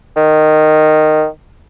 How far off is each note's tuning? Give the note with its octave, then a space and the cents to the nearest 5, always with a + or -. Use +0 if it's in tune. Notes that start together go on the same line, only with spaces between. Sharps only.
D#3 -10